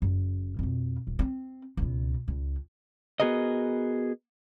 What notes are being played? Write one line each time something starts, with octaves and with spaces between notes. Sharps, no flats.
F#1
F2 B2
D#1
C4
C#2 B2
C#2
B3 F#4 G#4 A#4 B4 D#5